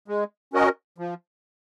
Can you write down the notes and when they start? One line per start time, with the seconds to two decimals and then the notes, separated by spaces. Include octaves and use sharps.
0.08 G#3
0.53 C#4 F#4 A#4 D#5
0.98 F3